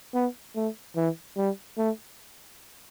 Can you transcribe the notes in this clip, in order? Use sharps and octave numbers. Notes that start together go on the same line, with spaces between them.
B3
A3
E3
G3
A3